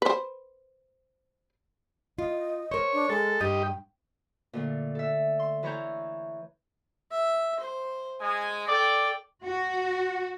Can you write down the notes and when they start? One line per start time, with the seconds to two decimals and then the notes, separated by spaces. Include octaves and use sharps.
0.02 B4 C5
2.18 F4 D#5
2.71 A#4 C5 C#5
2.93 D4
3.10 G#3 A4
3.41 G2 G4 D#5 G5
4.53 A#2 D3 A3
4.95 A4 E5
5.39 C6
5.63 E3 E4 C#5 A#5 G6
7.12 E5
7.60 C5
8.21 G#3 G#5
8.68 A4 D5 G5
9.44 F#4